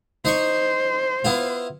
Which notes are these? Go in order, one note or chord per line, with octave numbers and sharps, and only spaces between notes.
D#4 C5 D#5 C#6
B3 E4 F4